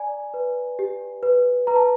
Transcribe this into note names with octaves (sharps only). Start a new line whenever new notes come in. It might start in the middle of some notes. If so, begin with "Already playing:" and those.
Already playing: D5 G#5 A#5
B4
G4
B4
B4 A#5
A5